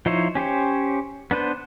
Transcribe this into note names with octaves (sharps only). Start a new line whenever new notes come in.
F3 D#4 E4 C5 C#5
C#4 G4 C5 C#5
B3 D4 B4 C5